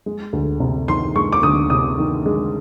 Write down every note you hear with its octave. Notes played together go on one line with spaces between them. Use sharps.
G#3
D2
C3
D#3 C6
G#3 C#6
D6
D2 D#6
C3 D#6
D#3
G#3